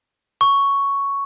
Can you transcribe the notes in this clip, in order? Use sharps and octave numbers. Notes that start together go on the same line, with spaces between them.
C#6